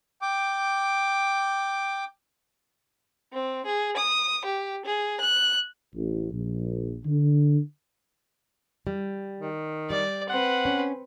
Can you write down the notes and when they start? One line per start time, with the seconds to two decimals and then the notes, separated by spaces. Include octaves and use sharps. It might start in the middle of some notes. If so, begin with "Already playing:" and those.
0.22 G5 D6
3.33 C4
3.66 G#4
3.97 D#6
4.45 G4
4.85 G#4
5.21 F#6
5.95 A1
6.33 A#1
7.05 D3
8.87 G3
9.40 D#3
9.90 G3 D5
10.29 C4 B4 F#5
10.65 C#4